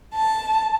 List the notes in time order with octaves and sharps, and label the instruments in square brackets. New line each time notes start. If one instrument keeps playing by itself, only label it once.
[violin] A5